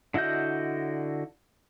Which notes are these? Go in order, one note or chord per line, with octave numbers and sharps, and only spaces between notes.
D3 E4 F#4 D#5 G6